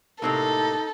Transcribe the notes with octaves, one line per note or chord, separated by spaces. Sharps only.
A2 C3 A#3 D#4 A4